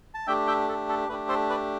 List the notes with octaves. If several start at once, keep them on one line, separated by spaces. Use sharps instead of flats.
A5
A3 D4 G4 E5 G5
E5 G5
A4
A4
A3 D4 G4 B4
A4 C5
B4 D5